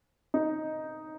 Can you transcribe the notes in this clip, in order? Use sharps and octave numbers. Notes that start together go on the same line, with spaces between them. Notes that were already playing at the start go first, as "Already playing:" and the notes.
D#4